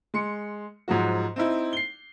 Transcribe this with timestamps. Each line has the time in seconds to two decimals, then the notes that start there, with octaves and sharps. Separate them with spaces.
0.14 G#3 C6 C#7
0.88 G#2 F3 F#3 F#4
1.36 C4 D#4 E4
1.73 C7 G7